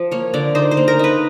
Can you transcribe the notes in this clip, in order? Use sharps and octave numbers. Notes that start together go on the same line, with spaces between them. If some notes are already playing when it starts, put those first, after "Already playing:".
Already playing: F3
A#3 C#5
D3 D5
D#4 C5
C5
A#3
A#4
D#4 B4